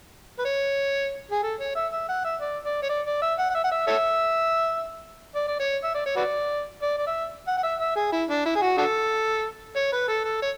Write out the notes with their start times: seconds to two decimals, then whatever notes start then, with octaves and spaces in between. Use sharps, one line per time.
0.39 B4
0.45 C#5
1.31 G#4
1.43 A4
1.60 C#5
1.76 E5
1.92 E5
2.09 F#5
2.24 E5
2.41 D5
2.65 D5
2.83 C#5
2.89 D5
3.06 D5
3.22 E5
3.39 F#5
3.50 F#5
3.55 E5
3.64 F#5
3.71 E5
3.87 A4 C#5 E5
5.35 D5
5.47 D5
5.60 C#5
5.84 E5
5.95 D5
6.06 C#5
6.16 F#4 B4 D5
6.82 D5
6.98 D5
7.07 E5
7.47 F#5
7.58 F#5
7.63 E5
7.80 E5
7.96 G#4
8.12 E4
8.29 D4
8.45 E4
8.56 G#4
8.62 F#4
8.78 D4 F#4 A4
9.76 C#5
9.92 B4
10.08 A4
10.25 A4
10.42 C#5